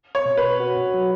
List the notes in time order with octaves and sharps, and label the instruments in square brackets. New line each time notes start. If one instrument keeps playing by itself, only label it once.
[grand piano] C#5
[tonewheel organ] B2
[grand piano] B4
[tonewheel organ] F#4
F#3